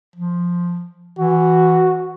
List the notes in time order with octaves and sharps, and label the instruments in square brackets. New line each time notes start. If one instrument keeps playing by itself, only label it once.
[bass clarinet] F3
[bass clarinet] E3 [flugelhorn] F#4